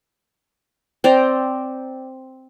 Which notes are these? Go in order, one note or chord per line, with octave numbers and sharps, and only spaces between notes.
C4 D5 G5 A#5